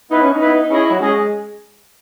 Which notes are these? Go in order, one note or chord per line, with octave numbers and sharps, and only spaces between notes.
B3 D#4 E4 B4
C#4
D#4
B3 E4 B4
D#4
C#4 E4 G#4 D#5
F#3
G#3 C#4 G#4 D#5